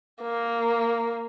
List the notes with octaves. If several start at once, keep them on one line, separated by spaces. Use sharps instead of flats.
A#3